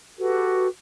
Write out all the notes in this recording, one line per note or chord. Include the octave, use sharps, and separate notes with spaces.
F#4 G4 A4 B4